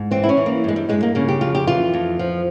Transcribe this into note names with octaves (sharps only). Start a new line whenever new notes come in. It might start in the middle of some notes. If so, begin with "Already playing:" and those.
Already playing: G#2
E3 C4
E4
C#4
E3
A#3
G2 G#3
G3
G2 G#3
A#3
C#3 A#3
G4
F2 F4
G4
E3 F4
F2
F3